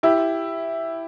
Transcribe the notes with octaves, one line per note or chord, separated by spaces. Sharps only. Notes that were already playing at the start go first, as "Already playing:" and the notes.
E4 G4